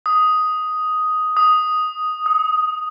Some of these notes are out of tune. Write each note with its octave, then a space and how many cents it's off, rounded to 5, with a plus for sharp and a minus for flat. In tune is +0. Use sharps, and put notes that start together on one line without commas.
D#6 +5
D#6 +0
D#6 +30